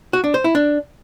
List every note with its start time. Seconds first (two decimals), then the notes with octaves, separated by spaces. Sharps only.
0.13 F#4
0.24 D4
0.34 C5
0.44 E4
0.55 D4